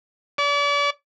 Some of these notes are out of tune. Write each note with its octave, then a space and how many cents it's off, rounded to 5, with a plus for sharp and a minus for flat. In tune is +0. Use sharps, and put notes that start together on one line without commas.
D5 -40